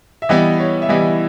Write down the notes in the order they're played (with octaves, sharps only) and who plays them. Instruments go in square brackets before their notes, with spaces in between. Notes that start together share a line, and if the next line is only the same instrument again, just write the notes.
[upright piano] E5
[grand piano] E3 G3 B3 E4 [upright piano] D#5
[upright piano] C#5
E5
[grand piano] E3 G3 B3 E4 [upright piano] D#5